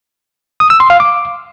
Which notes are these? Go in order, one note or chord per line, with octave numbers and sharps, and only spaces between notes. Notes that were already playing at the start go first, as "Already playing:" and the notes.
D#6
E6
C6
F5
D6